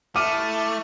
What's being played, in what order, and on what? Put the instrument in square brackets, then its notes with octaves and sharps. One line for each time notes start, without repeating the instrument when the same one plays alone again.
[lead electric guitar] A3 [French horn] E4 [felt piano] D6 F6 D#7